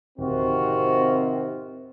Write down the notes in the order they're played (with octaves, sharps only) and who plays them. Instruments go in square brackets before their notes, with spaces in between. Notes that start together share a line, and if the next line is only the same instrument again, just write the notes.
[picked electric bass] D1 [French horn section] C3 D#3 C4 [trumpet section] F4 F#4